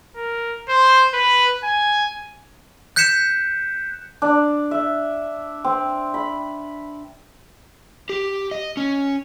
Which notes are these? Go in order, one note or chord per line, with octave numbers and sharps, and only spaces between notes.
A#4
C5
B4
G#5
F#6 G6 B6 C#7 E7
D4
E5
C4
B5
G4
D#5
C#4